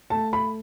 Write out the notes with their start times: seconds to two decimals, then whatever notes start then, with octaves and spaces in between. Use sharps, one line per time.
0.10 A3 A5
0.33 B5